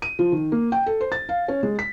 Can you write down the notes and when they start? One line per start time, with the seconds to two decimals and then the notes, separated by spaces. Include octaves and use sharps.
0.02 D#7
0.19 F3
0.32 D#3
0.52 A#3
0.72 G5
0.86 A4
1.01 C5
1.12 A6
1.29 F5
1.48 C#4
1.63 G#3
1.79 B6